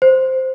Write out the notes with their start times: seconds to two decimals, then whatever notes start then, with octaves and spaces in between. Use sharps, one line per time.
0.02 C5